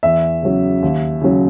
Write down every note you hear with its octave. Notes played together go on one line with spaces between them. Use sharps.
E2 E5
C#3 F#3
D#2
C#3 F#3